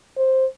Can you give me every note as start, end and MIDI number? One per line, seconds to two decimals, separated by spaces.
0.17 0.46 72